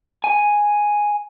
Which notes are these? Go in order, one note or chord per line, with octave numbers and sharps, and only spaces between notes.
G#5